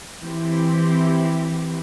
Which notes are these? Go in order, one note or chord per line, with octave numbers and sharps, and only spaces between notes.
E3 C4 E4 G4